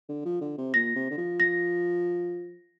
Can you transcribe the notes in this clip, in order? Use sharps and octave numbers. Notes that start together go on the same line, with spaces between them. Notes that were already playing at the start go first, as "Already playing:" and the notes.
D3
F3
D3
C3
A#2 A#6
C3
D3
F3
A#6